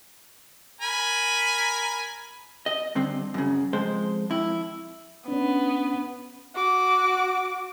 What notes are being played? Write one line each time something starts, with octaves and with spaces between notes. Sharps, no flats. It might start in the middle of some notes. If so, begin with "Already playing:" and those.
A#4 G#5 B5
D#5
D3 G3 C4
F#2 C#3
F2 G#3 C5
F2 E4
B3 C#4 D4
F#4 D6